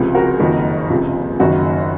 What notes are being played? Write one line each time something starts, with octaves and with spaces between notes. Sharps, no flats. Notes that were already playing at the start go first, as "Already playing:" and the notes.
Already playing: C#2 C3 F3
F#4 A#4
F#1 F2 D#3
C#2 C3 F3
F#1 F#2 D#3 F#4